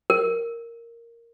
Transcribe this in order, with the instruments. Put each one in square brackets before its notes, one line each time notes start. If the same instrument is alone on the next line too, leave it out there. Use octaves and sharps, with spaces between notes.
[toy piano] A#4